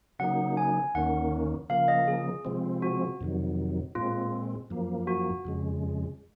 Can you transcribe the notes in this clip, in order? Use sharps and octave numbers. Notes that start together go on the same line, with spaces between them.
C#3 F#3 A#3 D#4 F#5
G#5
D#2 D#3 A#3 C#4 F#5
C#3 F3 A#3 F5
D#5
G#4
C3 F3 G#3 C4
F#4
F2 C3 D#3 F#3
A#2 G#3 C4 F4
F#2 F3 A#3
F#4
F2 C#3 G#3